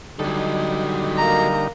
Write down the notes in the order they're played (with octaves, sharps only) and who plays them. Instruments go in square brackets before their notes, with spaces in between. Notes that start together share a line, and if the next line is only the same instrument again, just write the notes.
[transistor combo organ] D3 G3 D#4 [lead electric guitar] F#3 A4
[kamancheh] A#3 A#5